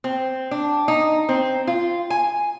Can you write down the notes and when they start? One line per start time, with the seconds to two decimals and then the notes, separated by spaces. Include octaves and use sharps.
0.04 C4
0.51 D4
0.88 D#4
1.29 C4
1.67 F4
2.10 G#5